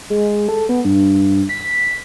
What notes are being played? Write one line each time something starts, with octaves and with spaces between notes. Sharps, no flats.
G#3
A4
B3
G2
B6